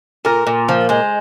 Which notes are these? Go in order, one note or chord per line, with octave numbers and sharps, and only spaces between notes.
A#2 A#4
A#2
F3
G#3 C5